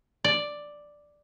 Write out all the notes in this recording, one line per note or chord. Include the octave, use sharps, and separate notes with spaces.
D5